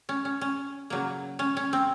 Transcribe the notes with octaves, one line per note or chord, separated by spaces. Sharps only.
C#4
C#4
C#4
C#3 F#3 A#3
C#4
C#4
C4